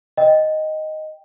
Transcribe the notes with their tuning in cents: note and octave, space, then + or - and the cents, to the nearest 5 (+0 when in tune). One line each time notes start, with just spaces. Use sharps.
D#5 +0 G5 +0